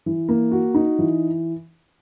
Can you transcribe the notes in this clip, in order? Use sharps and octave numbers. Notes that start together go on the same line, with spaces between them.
E3
A#3
F#4
D#4
E3